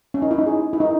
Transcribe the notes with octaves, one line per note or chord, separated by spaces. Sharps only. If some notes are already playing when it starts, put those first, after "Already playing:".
C#4
D#4
E4
D#4
G#4
E4
D#4